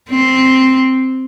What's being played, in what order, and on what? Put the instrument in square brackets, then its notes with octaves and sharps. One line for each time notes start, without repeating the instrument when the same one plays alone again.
[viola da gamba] C4